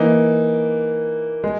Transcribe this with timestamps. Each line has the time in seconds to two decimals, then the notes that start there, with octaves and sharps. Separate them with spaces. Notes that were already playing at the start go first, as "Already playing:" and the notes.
Already playing: E3 A#3 D#4
1.44 G#3